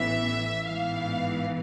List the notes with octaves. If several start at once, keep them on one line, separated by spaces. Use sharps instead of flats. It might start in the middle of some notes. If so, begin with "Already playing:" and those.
Already playing: A1 A2 E3 B3 E5
A1 G#2 E3 B3 F5